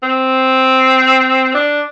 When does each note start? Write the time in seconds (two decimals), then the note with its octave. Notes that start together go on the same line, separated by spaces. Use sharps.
0.03 C4
1.54 D4